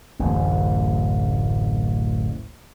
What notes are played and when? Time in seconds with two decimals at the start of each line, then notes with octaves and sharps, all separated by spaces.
0.19 D1 A1 F#2